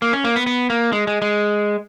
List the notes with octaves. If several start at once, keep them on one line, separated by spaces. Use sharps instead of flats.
A#3
C#4
A#3
B3
B3
A#3
G#3
G#3
G#3